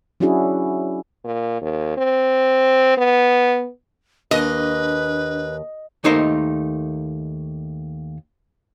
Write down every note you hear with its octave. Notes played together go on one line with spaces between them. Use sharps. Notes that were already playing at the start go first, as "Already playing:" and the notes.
F#3 C#4 D4 E4 F#4 G#4
A#2
D#2
C4
B3
D#2 D4 B4 D#5
D#2 A3 D#4 A#4 C5